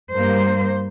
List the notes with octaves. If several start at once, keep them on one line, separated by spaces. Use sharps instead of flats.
G2 G3 A#3 C5